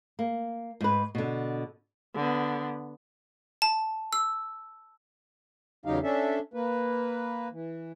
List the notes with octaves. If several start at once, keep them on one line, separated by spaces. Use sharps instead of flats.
A#3
G#2 B4
B2 D3
D3 B3
A5
E6
E2 C#3 F#3 D#4 G4 F5
C#4 D4 A4 E5
A#3 B4
E3